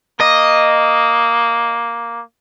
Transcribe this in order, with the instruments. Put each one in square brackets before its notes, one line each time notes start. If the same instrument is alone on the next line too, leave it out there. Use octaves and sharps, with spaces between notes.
[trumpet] A#3 [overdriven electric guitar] D#5